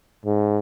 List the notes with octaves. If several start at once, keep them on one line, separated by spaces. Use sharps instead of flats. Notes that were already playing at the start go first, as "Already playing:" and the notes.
G#2